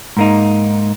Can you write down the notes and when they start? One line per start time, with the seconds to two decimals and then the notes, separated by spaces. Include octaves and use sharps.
0.17 G#2 A#3 D#4